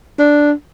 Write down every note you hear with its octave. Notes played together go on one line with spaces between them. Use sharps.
D4